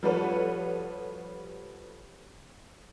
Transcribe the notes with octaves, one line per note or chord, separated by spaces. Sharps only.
F3 G3 F#4 A4 B4 C#5